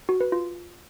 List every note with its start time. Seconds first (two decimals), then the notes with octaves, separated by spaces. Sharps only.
0.09 F#4
0.21 B4
0.32 F4